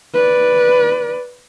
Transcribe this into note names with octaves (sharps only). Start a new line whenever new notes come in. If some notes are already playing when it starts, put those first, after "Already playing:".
B4 D5